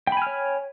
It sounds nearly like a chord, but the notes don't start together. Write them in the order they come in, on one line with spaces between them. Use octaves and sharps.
G5 B5 G#5 F6 C#5